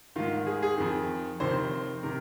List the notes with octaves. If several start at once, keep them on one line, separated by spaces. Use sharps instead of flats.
G#2 D#3 F4
G#4
G#4
F2 D#3
F2 C3 D#3 C5
C5
C3 D#3 A#4